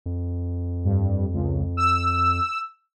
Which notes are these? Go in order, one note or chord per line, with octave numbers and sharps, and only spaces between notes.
F2
G2
C#2
E6